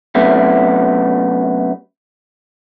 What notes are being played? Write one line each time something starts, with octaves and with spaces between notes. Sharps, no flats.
F#2 C3 A3 B3